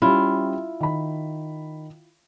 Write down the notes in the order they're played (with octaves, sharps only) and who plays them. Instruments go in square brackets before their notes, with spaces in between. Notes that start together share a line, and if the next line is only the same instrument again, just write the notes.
[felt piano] G3 C#4 [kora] E4 F4
[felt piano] D#3 B5